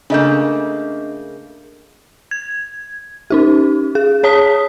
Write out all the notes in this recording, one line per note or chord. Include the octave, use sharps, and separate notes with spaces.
C#3 A3 A#3 D4 D#5 G6
G#6
C#4 D#4 G4
G#4
G#4 C#5 A5 D#6 B6